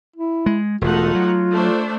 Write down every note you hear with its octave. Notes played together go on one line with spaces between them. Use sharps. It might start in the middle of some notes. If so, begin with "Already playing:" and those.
E4
G#3
E1 A3 D#4 F4 F#5
F#3
A3 D4 C5